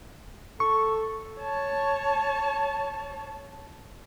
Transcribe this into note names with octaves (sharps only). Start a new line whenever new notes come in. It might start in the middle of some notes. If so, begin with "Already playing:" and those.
A4 C#6
C#5 A5